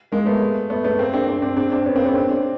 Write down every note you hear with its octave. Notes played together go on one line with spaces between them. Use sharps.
G#3 A#3
A3 B3
A3 B3
A3 B3
A#3 C4
C4 D4
C4 D4
C4 D4
C4 D4
C4 D4
B3 C#4
A#3 C4
B3 C#4
C4 D4
C4 D4